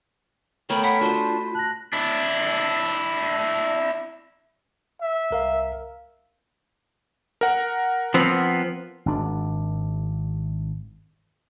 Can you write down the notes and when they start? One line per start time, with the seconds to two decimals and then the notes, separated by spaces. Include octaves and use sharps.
0.70 A3 B3 A#4 C#5 G5 B5
0.83 F#5 B5 B6
1.01 D4 F4 F#4 C5
1.55 A5 F#6 A#6
1.93 D4 E4
5.01 E5
5.31 C2 A#4 F5
7.41 A#4 F#5
8.14 F3 B3 C4
9.06 G#1 D4